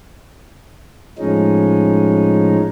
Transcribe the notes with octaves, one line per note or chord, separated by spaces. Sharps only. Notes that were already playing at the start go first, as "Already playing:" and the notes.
A2 F3 G#3 C#4 D#4